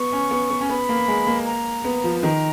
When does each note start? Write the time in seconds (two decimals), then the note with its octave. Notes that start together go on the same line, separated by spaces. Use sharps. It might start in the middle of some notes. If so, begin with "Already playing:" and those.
Already playing: B3 C#6
0.13 C#4
0.31 B3
0.50 B3
0.61 C#4
0.69 B3 B5
0.89 A#3
1.08 G#3
1.27 A#3
1.46 A#5
1.85 B3
2.04 F3
2.23 D#3 A#5